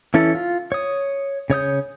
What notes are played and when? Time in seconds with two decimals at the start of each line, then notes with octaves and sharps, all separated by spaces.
0.14 E3 C#4 E4 A4
0.35 F4
0.72 C#5 D#6
1.50 C#3 C#5 D#6 G6